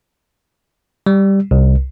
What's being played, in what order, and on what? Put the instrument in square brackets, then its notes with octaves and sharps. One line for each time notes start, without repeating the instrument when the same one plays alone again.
[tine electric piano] G3
C2